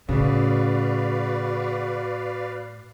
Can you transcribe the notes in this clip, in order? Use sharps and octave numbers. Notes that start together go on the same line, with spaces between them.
A2 C#3 F#4 B4 D5 F5